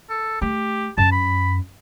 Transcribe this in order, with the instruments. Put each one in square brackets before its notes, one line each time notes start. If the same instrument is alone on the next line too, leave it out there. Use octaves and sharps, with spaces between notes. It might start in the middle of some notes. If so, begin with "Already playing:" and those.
[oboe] A4
[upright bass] A3 [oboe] G4
[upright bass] F#2 [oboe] A5
[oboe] B5